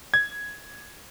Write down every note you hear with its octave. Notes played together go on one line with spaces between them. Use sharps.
G#6